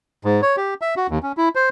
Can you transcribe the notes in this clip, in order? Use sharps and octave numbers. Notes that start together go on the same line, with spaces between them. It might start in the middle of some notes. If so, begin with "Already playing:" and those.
G#2
C#5
G4
E5
F#4
D#2
C#4
E4
C5